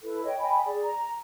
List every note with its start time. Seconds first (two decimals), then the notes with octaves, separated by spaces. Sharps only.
0.03 E4 A4 B4
0.24 C#5 D#5 G5
0.40 D#5 G5 G#5 B5
0.65 G#4 D5
0.83 A#5